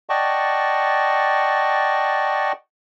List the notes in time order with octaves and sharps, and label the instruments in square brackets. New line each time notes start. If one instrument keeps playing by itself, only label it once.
[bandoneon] D5 D#5 F#5 G5 A5 C#6